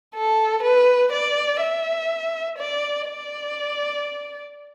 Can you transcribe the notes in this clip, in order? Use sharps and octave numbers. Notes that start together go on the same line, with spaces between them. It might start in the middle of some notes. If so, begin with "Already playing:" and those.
A4
B4
D5
E5
D5
D5